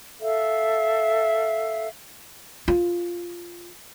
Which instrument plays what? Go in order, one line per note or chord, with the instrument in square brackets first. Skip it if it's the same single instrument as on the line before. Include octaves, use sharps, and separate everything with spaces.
[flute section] A4 E5 F5
[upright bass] F4